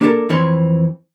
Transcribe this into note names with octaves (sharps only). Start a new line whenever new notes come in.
A#3 D4 F#4 G4 A4 A#4
F2 E3 C4 C#5 C6